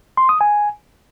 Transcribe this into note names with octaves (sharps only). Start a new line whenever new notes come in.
C6
D#6
G#5